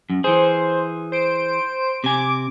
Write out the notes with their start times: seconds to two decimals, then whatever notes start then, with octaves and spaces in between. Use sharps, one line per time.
0.10 F#2
0.24 E3 G#4 C5
1.12 C5 D7
2.04 C3 G#5 D6